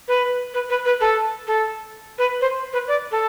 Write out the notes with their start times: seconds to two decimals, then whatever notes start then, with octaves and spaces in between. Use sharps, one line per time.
0.08 B4
0.54 B4
0.70 B4
0.85 B4
1.01 A4
1.47 A4
2.18 B4
2.41 C5
2.73 B4
2.88 D5
3.12 A4